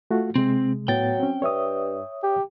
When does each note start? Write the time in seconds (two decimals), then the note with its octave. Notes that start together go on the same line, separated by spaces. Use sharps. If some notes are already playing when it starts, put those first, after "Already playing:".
0.11 A3 F4 F#4
0.36 C3 G#3 C4
0.88 A2 F#3 B3 G5 A6
1.19 C4 C#4
1.42 G2 C#5 E5 D#6
2.23 G4